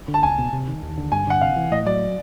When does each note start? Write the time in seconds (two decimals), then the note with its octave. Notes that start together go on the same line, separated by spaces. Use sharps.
0.08 D3
0.14 A5
0.23 C#2 G#5
0.38 B2
0.53 C3
0.68 D#3
0.82 D#2
0.98 D3
1.12 G2 G#5
1.27 D3 F#5
1.41 C3 F5
1.56 E3
1.71 A2 D#5
1.86 F#3 D5